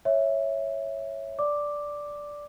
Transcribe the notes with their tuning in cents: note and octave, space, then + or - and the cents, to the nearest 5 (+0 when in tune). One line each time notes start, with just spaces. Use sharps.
C#5 -5 E5 +0
D5 -5 D6 +0